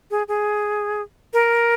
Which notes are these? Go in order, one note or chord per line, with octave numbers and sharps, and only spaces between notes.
G#4
G#4
A#4